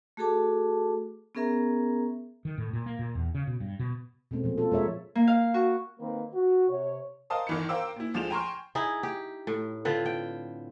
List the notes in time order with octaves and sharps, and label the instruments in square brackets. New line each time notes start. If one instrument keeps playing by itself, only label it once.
[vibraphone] A3 F#4 G#4 A4 A5 D6
B3 C#4 G#4 A#4 E5 A#5
[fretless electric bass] D#3
A2
A#2
A#3
A#2
E2
C#3
B2
G2
B2
[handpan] B2 G#3 A3 C4 C#4
A#2 F3
F3 F4 A4
B2 G#3 A#4 C#5 E5
[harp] A#3
F5
F#4
[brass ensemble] D#3 A#3 C4 A#4 B4
F#4
C3 C#5
[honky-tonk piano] A#4 C5 D#5 F5 A5 D#6
G1 D#3 E3 B5 C#7
A#4 C5 F5 G5 D6 E6
A#2 E4
D2 F3 G#3 E7 F7
G5 G#5 A#5 C6 C#6 F6
[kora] D#4 E4 G#4
G4
A2
D3 C4 F4 B4
G5